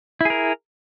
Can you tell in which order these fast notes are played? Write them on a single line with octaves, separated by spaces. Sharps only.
E4 G#4 A#4